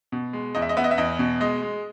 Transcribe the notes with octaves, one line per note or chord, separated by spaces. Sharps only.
B2
G#3
E2 D#5
E5
D#5
B3 E5
D#5
E5
E2 D#5
B2
G#3 D#5
G#3